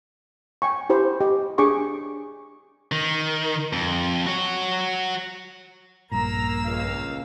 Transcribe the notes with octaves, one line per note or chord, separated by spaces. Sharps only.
G5 G#5 C#6
E4 G4 C5 B5
G4 D#5
D4 G#4 C#6 D6
D#3
F2
F#4 C#5
A#1 G2 A#2 A#3 A#5 E6
C#2 F5